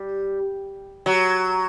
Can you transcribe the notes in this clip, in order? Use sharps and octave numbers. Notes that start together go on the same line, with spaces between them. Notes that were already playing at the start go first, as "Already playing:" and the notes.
Already playing: G3
F#3